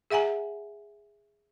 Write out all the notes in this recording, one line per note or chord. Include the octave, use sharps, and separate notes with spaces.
G#4 E5 F#5 G#5 A#5